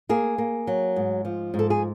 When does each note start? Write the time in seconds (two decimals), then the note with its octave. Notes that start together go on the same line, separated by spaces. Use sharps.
0.09 A#3 G#4
0.38 A#3
0.67 F#3
0.96 G#2
1.25 F3
1.54 G#2
1.59 A4
1.70 G#4